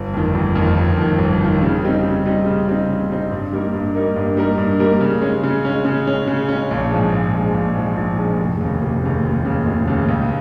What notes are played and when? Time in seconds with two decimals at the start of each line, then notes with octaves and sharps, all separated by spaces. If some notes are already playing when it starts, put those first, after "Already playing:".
Already playing: G1
0.14 F2 D#3
0.35 G1
0.55 F2 D#3
0.77 G1
0.97 F2 D#3
1.19 G1
1.40 F2 D#3
1.62 C#3
1.83 G3 C4 D#4
2.03 C#3
2.25 G3 C4 D#4
2.46 C#3
2.67 G3 C4 D#4
2.89 C#3
3.10 G3 C4 D#4
3.31 G2
3.52 G3 A#3 D#4 A#4
3.73 G2
3.95 G3 A#3 D#4 A#4
4.16 G2
4.37 G3 A#3 D#4 A#4
4.58 G2
4.79 G3 A#3 D#4 A#4
5.01 C#3
5.22 G#3 C#4
5.43 C#3
5.65 G#3 C#4
5.85 C#3
6.07 G#3 C#4
6.27 C#3
6.48 G#3 C#4
6.71 A#1
6.91 G#2 F3 G#3
7.12 A#1
7.33 G#2 F3 G#3
7.55 A#1
7.76 G#2 F3 G#3
7.97 A#1
8.18 G#2 F3 G#3
8.39 F1
8.61 D#2 C#3
8.82 F1
9.03 D#2 C#3
9.25 F1
9.45 D#2 C#3
9.66 F1
9.88 D#2 C#3
10.09 C#2